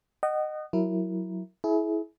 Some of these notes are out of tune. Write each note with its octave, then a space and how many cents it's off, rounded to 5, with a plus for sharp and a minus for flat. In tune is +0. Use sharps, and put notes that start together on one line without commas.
D#5 -20 F#5 +30
F#3 +0 E4 +0 A#4 +0
E4 -10 G#4 +35